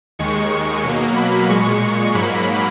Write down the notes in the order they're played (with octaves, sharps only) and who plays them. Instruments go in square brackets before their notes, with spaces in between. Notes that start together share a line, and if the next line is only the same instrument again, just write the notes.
[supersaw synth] D#2 D#3 G#3 C#6
B2 F#3 A#3
B5
A#2 G#3 C#6
G#2 F#3 A#3 B5